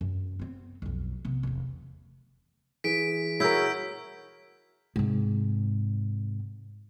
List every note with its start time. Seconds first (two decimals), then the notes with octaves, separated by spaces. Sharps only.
0.01 F#2
0.40 B3 C4
0.82 B1 F2
1.25 C3 B3
1.43 F1 E2
2.84 E3 G#4 B6 D7
3.40 E4 F#4 G#4 A#4 C#5 E6 G6 B6
4.96 G#2 C3